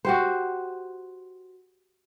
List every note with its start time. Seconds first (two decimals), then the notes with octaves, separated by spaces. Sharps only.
0.05 F#4 G4 C5